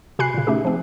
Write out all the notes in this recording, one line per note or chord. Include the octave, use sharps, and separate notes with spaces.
C3 F#4 G#5 B5 F#6 C7
A#2 C#3
A3 C#4 D#4 G4 G#4
F3 A3 C4